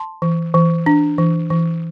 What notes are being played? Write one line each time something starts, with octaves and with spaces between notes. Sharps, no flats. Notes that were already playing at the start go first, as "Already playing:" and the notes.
Already playing: A5 C6
E3
E3
D4
E3
E3